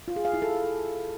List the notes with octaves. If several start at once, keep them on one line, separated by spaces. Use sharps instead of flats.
F4
G#4
F5
E4
A4